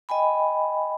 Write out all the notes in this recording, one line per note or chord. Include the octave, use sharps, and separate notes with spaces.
D#5 G5 G#5 B5